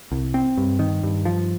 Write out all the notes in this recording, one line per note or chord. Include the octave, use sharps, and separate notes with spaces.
C2
C4
G2
D#3
G2
F3